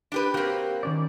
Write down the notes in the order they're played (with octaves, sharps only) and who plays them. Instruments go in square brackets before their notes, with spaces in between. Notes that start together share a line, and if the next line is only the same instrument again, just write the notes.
[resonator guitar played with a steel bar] D4 G4 B4
[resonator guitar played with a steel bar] A#3 C4 [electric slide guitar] F#4 G4
[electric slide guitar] D#3 C#4 D5